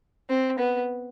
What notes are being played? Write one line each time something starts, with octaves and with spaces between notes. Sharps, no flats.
C4
B3